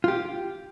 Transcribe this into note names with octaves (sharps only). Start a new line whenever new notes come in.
F4
G4